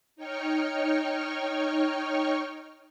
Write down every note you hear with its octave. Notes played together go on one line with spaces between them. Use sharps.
D#4 C#5 G5 C#6 F6